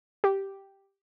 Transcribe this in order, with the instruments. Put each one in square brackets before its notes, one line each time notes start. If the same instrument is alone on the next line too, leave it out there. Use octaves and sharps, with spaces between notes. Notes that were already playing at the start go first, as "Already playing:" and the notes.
[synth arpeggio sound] G4